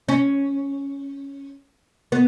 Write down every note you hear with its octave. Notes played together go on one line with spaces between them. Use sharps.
C#4
B3